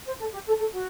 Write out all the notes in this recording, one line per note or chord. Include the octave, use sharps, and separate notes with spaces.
C5
A4
G4
A4
A4
F#4